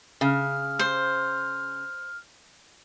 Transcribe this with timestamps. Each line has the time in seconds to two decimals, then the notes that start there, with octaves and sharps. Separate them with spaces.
0.21 C#3 F6
0.79 C5